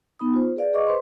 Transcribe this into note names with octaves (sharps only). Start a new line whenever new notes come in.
B3 D#4 B5 D#6
F4 C5
G#4 B4 D5 F5
G#4 B4 D#5 C#6 D6
B4 C5 C6